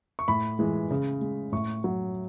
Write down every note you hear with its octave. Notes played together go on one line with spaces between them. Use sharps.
C#6
A2 B5
E3 G#3
C#3
G#3
A2 C#6
F#3